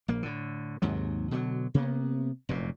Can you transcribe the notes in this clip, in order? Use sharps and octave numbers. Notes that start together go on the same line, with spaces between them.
A#1 A#3
A2 D3
D#2 G#2 C3 F#3
B2 D3 E3 F#3
C3 A#3 B3
F1 F#2 A#2